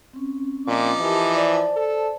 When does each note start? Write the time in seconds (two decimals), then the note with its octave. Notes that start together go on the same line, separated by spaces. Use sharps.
0.13 C4 C#4
0.68 A#2 F3 D#4 D6
1.00 E3 G4 A#4 A5
1.35 C5 D5 A5
1.76 A4